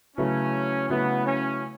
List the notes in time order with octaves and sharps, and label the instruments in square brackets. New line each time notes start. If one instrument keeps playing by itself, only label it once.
[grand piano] C#3 F#3 A3 E4 B4 [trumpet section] C#4
[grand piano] C#3 F#3 A3 E4 B4 [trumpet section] B3
[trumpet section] C#4